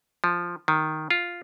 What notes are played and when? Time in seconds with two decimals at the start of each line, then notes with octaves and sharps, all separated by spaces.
0.24 F3
0.68 D#3
1.10 F4